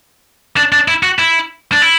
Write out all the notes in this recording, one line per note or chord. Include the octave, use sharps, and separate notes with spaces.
D4
D4
E4
F#4
E4
D4
E4